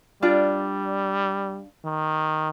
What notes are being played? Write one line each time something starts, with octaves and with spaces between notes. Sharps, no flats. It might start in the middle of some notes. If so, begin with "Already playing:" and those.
G3 D4 F4 D5
D#3